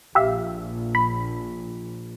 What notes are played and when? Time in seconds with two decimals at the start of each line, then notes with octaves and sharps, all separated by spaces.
0.15 A#1 G4 E5 F5
0.95 B5